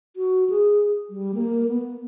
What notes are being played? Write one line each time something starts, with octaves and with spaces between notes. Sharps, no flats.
F#4
G#4
G3
A#3
B3